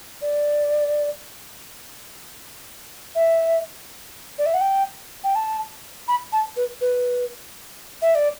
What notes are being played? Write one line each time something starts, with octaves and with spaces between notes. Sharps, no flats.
D5
E5
D5
E5
F#5
G5
G5
A5
B5
A5
B4
B4
E5
D5